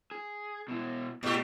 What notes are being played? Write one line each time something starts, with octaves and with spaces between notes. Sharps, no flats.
G#4
B2 E4
G#2 B2 G4